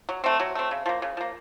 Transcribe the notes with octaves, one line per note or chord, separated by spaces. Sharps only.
F#3
A3 C4
F#3
A3 C4
C#3
F3 A#3
C#3
F3 A#3